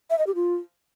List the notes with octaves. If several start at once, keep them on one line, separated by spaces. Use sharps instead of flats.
E5
D#5
G4
F4